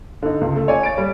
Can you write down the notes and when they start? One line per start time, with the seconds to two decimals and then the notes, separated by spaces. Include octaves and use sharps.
0.22 D3 D#4
0.41 C#2
0.56 A3
0.68 C#5 D5 G#5
0.83 A6 D7
0.98 G3